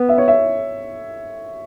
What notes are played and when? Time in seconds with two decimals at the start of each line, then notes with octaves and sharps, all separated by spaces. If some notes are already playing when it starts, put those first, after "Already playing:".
Already playing: B3
0.09 E5
0.18 C#5
0.28 E5